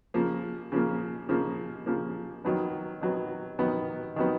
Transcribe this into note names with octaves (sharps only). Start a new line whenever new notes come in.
C#3 F3 A#3
C#3 F3 A#3
C#3 F3 A#3
C#3 F3 A#3
D#3 F#3 B3
D#3 F#3 B3
D#3 F#3 B3
D#3 F#3 B3